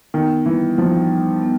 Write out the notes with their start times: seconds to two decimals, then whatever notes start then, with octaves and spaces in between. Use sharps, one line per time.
0.14 D#3 B3
0.46 E3 G3
0.78 F3 D#4
1.10 G3
1.42 B3